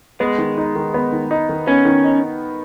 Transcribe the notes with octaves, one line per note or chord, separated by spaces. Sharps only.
G#3 B3
D#3
D#4
D#3
B3
D#3
D#4
D#3
B3 C#4
D#3
D#4